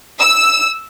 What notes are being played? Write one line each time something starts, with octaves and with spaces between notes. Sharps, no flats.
E6